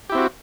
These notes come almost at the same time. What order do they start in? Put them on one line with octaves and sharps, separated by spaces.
G4 E4 C4 F#4